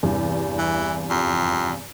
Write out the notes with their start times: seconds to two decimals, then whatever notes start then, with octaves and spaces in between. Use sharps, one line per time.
0.03 E2 G2 C3
0.58 E3
1.10 F2